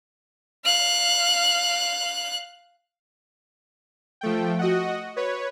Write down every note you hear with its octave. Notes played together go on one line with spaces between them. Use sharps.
F5 F#6
F3 A3 G5
F#4 D#5 F#5
B4 C#5